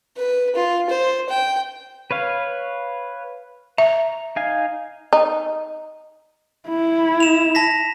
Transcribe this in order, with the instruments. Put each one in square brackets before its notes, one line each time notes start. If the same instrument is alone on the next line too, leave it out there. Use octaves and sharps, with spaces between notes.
[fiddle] B4
F4
C5
G5
[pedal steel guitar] B4 C#5 F5
[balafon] E5 [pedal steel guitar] A#5
[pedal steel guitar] D#4 F5 G#5
[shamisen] D#4
[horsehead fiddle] E4
[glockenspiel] E7 F7
A5 A#6 B6